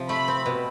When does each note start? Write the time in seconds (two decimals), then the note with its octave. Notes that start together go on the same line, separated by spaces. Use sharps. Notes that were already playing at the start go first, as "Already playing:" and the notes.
Already playing: C3 F3
0.09 A3 B5
0.28 C4
0.46 B2